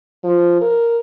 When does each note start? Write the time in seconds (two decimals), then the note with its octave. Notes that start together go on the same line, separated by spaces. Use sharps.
0.24 F3
0.61 A#4